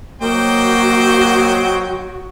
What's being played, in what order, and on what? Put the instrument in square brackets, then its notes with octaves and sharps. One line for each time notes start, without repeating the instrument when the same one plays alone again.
[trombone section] F#3 [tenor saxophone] A#3 [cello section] F#4 [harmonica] C5 D#5 G5